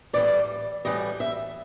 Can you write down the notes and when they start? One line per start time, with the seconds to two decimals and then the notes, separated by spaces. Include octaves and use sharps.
0.13 A2 E3 G3 D5
0.85 A2 E3 G3 D#5
1.20 E5